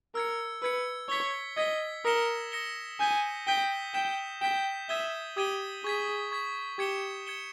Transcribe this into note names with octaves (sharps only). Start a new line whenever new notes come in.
A#4 E6 G#6 C#7
B4 E6 G#6 C#7
C#5 G#6 B6 G7
D#5 G#6 B6 G7
A#4 D#6 A#6 C#7 E7 G7
D#6 A#6 C#7 E7 G7
G#5 D#6 G6 B6 D#7 G7
G5 D#6 G6 B6 D#7 G7
G5 G6 B6 E7
G5 G6 B6 E7
E5 D#6 G#6 D#7 G7
G4 D#6 G#6 D#7 G7
G#4 C#6 G#6 B6
C#6 G#6 B6
G4 G#6 C#7 E7 G7
G#6 C#7 E7 G7